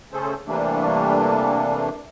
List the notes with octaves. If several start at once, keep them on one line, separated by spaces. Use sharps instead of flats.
C#3 A3 C#4 G#4 A4 C5
C3 E3 G3 A3 A#3 D4